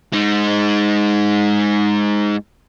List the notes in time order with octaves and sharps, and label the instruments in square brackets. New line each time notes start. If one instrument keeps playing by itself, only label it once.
[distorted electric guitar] G#3 D#4